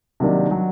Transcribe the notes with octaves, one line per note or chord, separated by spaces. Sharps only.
C3 D#3 F#3 A#3 D4
F#3